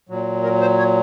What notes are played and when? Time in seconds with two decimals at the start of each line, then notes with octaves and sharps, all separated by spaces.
0.09 A#2 F#3
0.43 A#4
0.61 C5
0.78 C#5